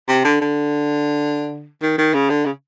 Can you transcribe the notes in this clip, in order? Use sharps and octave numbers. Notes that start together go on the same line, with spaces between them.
C3
D3
D3
D#3
D#3
C#3
D3
C#3